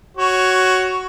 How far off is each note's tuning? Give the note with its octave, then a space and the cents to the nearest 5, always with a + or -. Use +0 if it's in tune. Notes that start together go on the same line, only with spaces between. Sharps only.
F#4 +10 C#5 +0